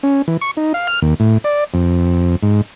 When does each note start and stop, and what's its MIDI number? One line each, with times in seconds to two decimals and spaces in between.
0.03 0.22 61
0.28 0.37 52
0.41 0.51 85
0.57 0.73 63
0.74 0.87 77
0.87 1.00 89
1.02 1.14 39
1.20 1.38 45
1.44 1.64 74
1.74 2.36 41
2.43 2.61 44